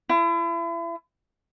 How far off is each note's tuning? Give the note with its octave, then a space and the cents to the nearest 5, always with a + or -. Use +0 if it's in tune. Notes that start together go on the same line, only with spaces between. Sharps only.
E4 +35